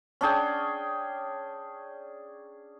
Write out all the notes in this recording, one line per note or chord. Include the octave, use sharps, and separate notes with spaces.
C#4 D4 G#4 G5